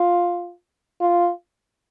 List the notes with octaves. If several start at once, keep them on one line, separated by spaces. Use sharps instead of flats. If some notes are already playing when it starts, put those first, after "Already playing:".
Already playing: F4
F4